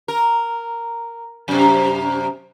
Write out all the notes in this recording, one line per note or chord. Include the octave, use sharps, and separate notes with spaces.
A#4
F#2 C3